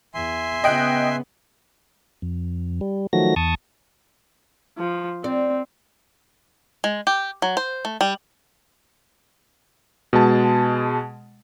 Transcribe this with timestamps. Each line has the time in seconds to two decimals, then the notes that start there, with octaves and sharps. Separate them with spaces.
0.14 E2 E5 G#5 C6
0.64 C#3 B3 D#5 G5 F#6
2.22 F2
2.81 G3
3.13 D#3 F3 F#3 A3 F#4 A#6
3.36 E2 A5 C#6 D#6
4.78 F3
5.24 C4 D5
6.84 G#3
7.07 G4
7.42 F#3
7.57 C5
7.85 A3
8.01 G3
10.13 B2 G#3 A5